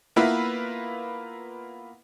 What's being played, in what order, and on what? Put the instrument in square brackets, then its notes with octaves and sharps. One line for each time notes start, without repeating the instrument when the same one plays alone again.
[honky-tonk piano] A#3 B3 E4 F4 B4 E5